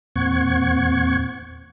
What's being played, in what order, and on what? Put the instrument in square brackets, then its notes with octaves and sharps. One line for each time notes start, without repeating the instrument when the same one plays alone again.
[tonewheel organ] E2 A#2 C4 F#5 C#6 G#6